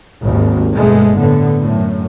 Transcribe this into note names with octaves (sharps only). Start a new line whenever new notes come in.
G#1 D#2
G1 B2 G#3 A3
A2 D3 B3
F#2 A2